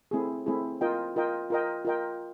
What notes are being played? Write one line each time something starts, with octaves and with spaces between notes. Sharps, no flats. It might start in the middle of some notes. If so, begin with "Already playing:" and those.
A3 C4 E4 G#4
A3 C4 E4 G#4
F4 A#4 D#5 G5
F4 A#4 D#5 G5
F4 A#4 D#5 G5
F4 A#4 D#5 G5